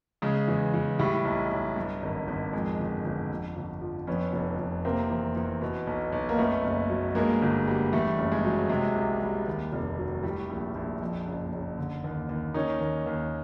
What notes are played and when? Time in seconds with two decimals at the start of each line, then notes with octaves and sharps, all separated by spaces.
0.22 C#3 G#3
0.48 E2
0.74 E2
0.99 A2 G3
1.25 B1
1.51 B1
1.76 G2
2.03 G#1
2.27 G#1
2.53 F2 G#3
2.79 G1
3.05 G1
3.30 F2
3.56 G1
3.81 F3
4.07 F2 B3 C#4
4.33 F1
4.58 F1
4.85 C3 A#3 C4
5.10 E2
5.36 E2
5.61 B2
5.87 B1
6.12 B1
6.29 A#3
6.38 F#2 A3 B3
6.64 F#1
6.90 F#3
7.15 G2 G#3 A#3
7.42 G1
7.68 G3
7.93 E2 G3 A3
8.18 F#1
8.32 G#3
8.45 F#3
8.69 C3 G#3
8.95 C2
9.22 G3
9.47 D#2
9.72 F1
9.98 F#3
10.23 A2 G3 A3
10.49 A#1
10.75 A#1
11.01 F2
11.27 F#1
11.52 F#1
11.78 D3
12.04 D#2
12.29 D#2
12.54 D#3 C#4 D#4
12.81 D#2
13.06 D#2